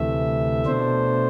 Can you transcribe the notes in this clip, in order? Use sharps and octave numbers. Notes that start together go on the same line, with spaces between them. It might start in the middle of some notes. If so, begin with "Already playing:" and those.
Already playing: D2 C3 E3 A3 E5
B2 A3 D4 C5